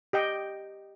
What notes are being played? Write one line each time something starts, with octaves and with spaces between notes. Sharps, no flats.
G4 D#5 G5